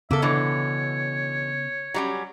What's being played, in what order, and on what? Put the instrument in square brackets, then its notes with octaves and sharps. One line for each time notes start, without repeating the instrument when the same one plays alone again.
[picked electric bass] C#3 B3 [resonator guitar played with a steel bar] A#3 A4 [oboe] E5
[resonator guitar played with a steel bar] B2 D3 E3 [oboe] C#5
[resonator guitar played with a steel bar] F#3 G3 C#4